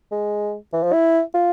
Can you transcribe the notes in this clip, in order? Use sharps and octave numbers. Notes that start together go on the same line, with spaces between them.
G#3
E3
F3
E4
F4